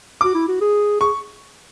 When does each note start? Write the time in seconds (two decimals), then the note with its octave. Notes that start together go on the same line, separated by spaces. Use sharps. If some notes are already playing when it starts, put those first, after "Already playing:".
0.21 F#4 D6
0.35 E4
0.48 F#4
0.61 G#4
1.00 G#4 C#6